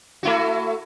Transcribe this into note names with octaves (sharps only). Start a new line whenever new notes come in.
A3 E4 F#4